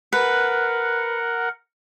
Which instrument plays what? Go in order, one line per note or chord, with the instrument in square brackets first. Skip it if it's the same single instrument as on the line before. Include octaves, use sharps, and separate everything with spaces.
[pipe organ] A#4 F#5 [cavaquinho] B4